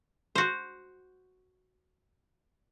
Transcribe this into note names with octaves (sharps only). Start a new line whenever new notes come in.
F#4 C5